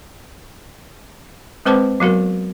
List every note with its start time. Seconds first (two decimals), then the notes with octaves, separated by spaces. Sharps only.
1.65 G#3 C4 B4 C5 A5 D6
2.00 F#3 B3 F#4 A#4